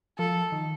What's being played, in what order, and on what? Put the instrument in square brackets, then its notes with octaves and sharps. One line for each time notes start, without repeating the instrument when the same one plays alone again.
[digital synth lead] F3 [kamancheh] A4
[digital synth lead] D#3